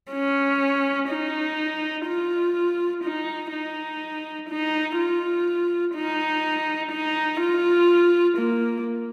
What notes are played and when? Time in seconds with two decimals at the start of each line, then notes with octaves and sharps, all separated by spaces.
0.12 C#4
1.09 D#4
2.06 F4
3.04 D#4
3.52 D#4
4.49 D#4
4.97 F4
5.95 D#4
6.91 D#4
7.40 F4
8.38 A#3